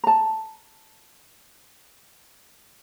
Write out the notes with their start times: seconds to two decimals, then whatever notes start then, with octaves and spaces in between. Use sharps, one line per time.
0.04 A5 A#5